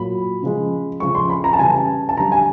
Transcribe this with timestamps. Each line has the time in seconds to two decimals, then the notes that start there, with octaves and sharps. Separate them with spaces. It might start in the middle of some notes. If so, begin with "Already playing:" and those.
Already playing: A#2 F#3 B5
0.42 C#3 F3 G#3
1.00 C#3 F3 G#3 C#6
1.15 C6
1.30 B5
1.44 A#5
1.53 A5
1.59 C#3 E3 G3 G#5
1.73 A5
2.09 A5
2.17 D3 G3 A#5
2.32 G#5